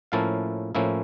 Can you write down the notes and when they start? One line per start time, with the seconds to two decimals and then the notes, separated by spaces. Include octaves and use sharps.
0.12 A2 F3 A#3 C#4 E4 F5 A5
0.75 A2 F3 A#3 C#4 E4